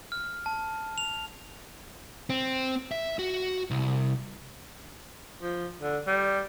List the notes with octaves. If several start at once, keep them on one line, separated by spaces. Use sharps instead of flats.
F6
A5
F7
C4
E5
F#4
C2
F3
D3
G3